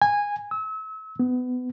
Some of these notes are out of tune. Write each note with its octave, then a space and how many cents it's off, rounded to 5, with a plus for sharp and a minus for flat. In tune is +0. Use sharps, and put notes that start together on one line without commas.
G#5 -15
E6 -35
B3 +25